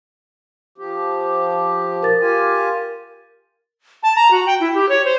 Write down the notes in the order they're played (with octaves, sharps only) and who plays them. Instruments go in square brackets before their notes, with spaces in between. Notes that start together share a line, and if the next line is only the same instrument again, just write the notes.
[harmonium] F3 G4
[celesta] A#4 A6
[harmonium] F4 G4 G#5
[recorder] A5
A#5
F#4
G5
E4
G4
C#5
C5